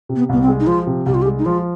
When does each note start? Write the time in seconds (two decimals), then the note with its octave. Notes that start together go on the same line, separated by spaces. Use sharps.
0.09 C3
0.16 B3
0.29 C2 B3
0.42 C4
0.48 G#3
0.60 D#4
0.67 F3 F4
0.87 C3
1.06 C2 G4
1.14 F4
1.22 G4
1.26 G#3
1.39 D#4
1.45 F3 F4